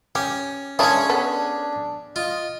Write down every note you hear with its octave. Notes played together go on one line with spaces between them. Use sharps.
C#4 G4
C#4 D4 E4 F4 G#4 C#5
B3 D4 A4
F4 D#5